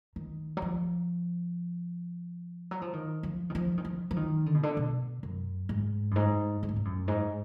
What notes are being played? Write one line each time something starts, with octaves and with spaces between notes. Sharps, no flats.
D#3
F#3
F3
F#3
F3
D#3
F3
D#3
F3
D#3
F3
F3
D#3
D3
B2
D3
B2
F#2
G#2
F#2
G#2
G#2
A#2
G#2
F#2
G#2